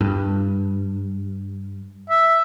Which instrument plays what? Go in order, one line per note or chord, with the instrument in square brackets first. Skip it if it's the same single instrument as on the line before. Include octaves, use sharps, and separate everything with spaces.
[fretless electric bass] G2
[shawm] E5